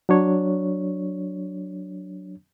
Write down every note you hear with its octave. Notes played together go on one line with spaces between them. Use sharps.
F#3 D4 C#5